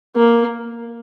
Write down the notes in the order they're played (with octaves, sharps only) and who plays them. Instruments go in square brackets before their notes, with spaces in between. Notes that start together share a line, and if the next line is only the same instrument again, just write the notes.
[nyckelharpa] A#3